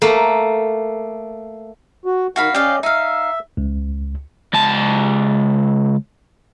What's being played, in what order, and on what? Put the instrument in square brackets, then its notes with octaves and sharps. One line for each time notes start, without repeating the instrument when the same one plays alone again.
[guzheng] A3 A#3
[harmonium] F#4
[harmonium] D#3 [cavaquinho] F#4 F5 B5
[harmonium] C#4 D5 D#5 [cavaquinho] G4 F5
[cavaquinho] D#4 F5 [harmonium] E5
[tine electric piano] C#2
[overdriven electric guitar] C#2 A5